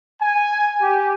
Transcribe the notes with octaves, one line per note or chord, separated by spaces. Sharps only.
G#5
G4